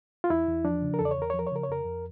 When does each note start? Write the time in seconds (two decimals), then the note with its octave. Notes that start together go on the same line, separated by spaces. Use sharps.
0.24 F4
0.30 E2 E4
0.48 E2
0.65 F3 D4
0.82 C#3
0.94 A#4
0.99 E2 A4
1.05 D5
1.11 C#5
1.17 E2 A#4
1.30 C#5
1.34 F3
1.39 A#4
1.47 C#5
1.52 C#3 A#4
1.63 C#5
1.69 F2 A#4
1.85 F2